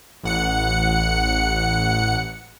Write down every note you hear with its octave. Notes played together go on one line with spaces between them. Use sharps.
A1 F#5 C#7